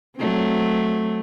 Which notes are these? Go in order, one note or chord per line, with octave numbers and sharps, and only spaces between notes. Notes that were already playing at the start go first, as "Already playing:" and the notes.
F#3 A3 C4